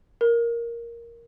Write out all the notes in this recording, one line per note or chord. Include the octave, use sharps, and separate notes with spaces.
A#4